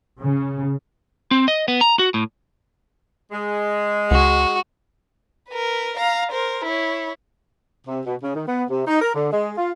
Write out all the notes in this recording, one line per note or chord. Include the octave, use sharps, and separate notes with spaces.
C#3
C4
D#5
B3
A#5
F#4
A2
G#3
C#2 F#4
A#4 B4
F5 A#5
A#4 C5
E4 C#5
C3
B2
C#3
D#3
B3
C3
D#4
A#4
D3
G#3
F4